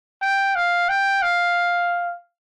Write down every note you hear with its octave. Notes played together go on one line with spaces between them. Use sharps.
G5
F5
G5
F5